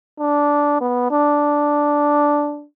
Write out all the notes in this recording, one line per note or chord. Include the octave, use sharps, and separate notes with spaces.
D4
B3
D4